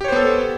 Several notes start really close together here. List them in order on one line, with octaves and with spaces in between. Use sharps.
G4 C#5 C5 B3 A4